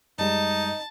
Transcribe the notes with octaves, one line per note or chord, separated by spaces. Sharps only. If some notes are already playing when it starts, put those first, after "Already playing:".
F#2 G3 G#3 D#4 D#5 A5